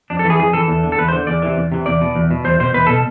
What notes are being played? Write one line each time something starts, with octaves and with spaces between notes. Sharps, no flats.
F2 D4
A4
E3 G#4
F2 G#4
E3 A4
E2
D3
A4
E2 B4
C5
D3
E2 D5
C3 E3
E2
C3 E3
E2 D5
B2
E2
B2
E2 C5
B2 C5
E2 B4
B2 A4